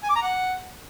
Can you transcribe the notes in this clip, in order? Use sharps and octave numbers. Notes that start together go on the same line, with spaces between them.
G#5
D6
A#5
F#5